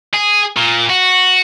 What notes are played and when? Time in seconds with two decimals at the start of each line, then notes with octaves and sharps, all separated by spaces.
0.14 G#4
0.57 A#2
0.90 F#4